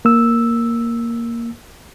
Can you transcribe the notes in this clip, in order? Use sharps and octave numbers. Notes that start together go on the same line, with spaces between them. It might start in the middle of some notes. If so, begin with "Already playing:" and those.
A#3 E6